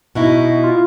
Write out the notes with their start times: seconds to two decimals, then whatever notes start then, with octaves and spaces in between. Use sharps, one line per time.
0.15 B2 D#4 E4 F#4
0.63 F4